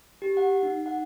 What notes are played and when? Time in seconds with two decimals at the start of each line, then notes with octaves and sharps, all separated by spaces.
0.22 G4
0.37 F#5
0.63 D#4
0.86 F#5